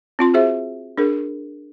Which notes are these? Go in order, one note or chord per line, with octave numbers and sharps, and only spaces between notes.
C4 F4 C6
F#4 G#4 C5 E5
D4 G#4 A#4